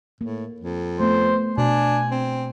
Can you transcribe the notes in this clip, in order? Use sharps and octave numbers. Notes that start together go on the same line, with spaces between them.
A2 A#3
F2
A3 B3 C5
B2 D4 G#5
C4